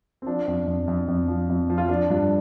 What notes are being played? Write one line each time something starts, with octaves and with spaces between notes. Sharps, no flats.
C4
F3 D4
F2
F2
F2
F2
F3
F2
F3
F4
F3 D4
G2